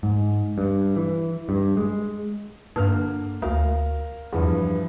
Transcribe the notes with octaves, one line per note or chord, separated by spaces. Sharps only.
G#2
G2
E3
G2
G#3
G2 D3 A#3 F6
D2 A#4 F5
E2 G2 E3 F3